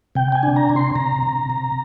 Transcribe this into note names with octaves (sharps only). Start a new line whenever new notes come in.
C3 G5
G5
G#5
D4
A#5
C3
C6
C3 A#5
C3
C3